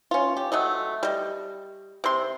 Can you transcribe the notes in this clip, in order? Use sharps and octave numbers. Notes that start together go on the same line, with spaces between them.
C#4 F4
G4
F#3 A3 D#5
G3 D#5
C3 C6